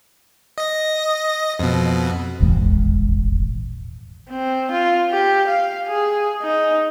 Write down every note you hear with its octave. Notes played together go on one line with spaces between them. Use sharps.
D#5 A#6
F2 B2
D#1 G#1 E2 G#3
C4
F4
G4
F5
G#4
D#4